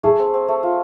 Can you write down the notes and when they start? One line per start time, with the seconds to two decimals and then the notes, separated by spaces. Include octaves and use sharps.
0.03 A3 G#4
0.19 C4
0.34 C4
0.48 A3
0.63 F4